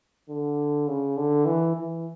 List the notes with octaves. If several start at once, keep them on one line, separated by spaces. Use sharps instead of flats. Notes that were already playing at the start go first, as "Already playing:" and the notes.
D3
C#3
D3
E3
E3